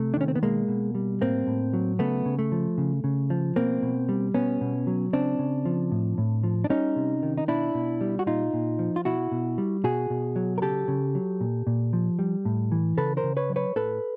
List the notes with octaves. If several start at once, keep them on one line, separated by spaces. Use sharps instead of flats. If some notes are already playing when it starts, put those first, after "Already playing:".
Already playing: C3 A3
D4
D#3 C#4
C4
B3
B2 G#3 A#3
B2
G3
A2 A#3 C4
A2
F#3
C#3 A3 B3
C#3
A3
F3
C#3
C#3
F3
B2 A#3 C4
B2
G3
B2 B3 C#4
B2
F#3
C#3 C4 D4
C#3
F3
A2
A2
F3
D4
G3 C#4 D#4
C3
D#3
D#4
B2 D4 E4
B2
G3
F#4
A#2 D#4 F4
A#2
F3
F4
B2 E4 F#4
B2
G3
B2 F#4 G#4
B2
F#3
A#4
C#3 G4 A4
C#3
F#3
A#2
A#2
F3
G3
A2
E3
C#3 A4 B4
A#4 C5
C#3
B4 C#5
F#3
B4 C#5
A2 A4 B4